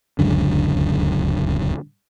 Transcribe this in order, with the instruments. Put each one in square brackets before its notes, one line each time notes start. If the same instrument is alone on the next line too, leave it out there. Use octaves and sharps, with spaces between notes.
[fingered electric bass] D1 C#2 F#2 D3